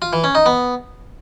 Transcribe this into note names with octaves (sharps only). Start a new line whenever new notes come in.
F4
E3
C#4
D#4
B3